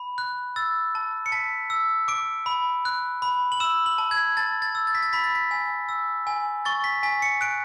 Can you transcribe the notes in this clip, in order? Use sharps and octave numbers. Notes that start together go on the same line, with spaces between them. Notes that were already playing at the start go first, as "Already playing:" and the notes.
Already playing: B5
F#6
E6 A6
A5
C#7
A5 B6
E6
D6 D7
B5
F#6
B5
F#7
E6 E7
F#7
A5
G#6
A5 A6
A6
E6
A6
B6
A6
B5 B6
A6
B6
G#5
E6
G#5
C#6 A6
B6
G#5 B6
C#7
F#6 D7